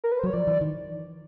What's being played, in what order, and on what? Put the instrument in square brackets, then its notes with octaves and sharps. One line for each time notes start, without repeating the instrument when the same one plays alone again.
[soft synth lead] A#4
B4
C5
[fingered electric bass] F#3 [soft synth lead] C#5
[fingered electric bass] F3 [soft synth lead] D5
[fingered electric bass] E3
D#3